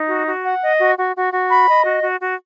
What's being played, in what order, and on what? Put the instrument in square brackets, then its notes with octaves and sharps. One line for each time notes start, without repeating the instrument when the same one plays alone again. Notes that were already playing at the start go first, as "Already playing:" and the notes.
Already playing: [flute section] D#4
F#4
F#4
F#5
D#5
F#4
F#4
F#4
F#4
B5
D#5
F#4
F#4
F#4